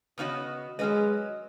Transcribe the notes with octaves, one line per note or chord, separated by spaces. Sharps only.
C#3 B3 C#4 D#4 F#4 D#5
F#3 G#3 C#4 B4 D#5